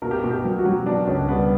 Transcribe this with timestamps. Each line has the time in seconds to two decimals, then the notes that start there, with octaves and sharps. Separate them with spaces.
0.02 B2 A#4
0.11 G4
0.20 A#4
0.23 B2
0.31 G4
0.44 F#3
0.59 F#4
0.65 F#3
0.86 B2 D4
1.07 C#2 C#4
1.28 G3 B3